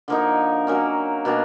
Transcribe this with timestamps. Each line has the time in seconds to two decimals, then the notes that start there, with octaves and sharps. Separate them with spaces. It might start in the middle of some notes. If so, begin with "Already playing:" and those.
0.08 D3 F3 A#3 D#4
0.67 F#3 A#3 C#4
1.25 B2 F#3 A#3 D4